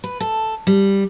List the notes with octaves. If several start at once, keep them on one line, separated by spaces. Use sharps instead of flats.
B4
A4
G3